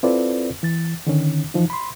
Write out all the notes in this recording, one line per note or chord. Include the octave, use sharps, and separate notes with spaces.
C4 E4 F4 A4 B4 D5
E3 A6
D3 D#3 C#4
E3 F3 D#4
B5 C6